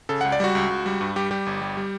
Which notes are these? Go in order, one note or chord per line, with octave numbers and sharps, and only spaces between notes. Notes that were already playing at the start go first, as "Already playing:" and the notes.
C#3 A4
C#2 F#5
D5
G3 F#4
C#2
C#2
G3
G2
G3 G4
G3 G4
G1
G3
G3